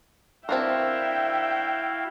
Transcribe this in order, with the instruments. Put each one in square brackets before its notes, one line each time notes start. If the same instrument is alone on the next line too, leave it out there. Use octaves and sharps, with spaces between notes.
[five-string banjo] C4 D4 A#4 [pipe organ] E4 F#4 F5 [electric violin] E5 G5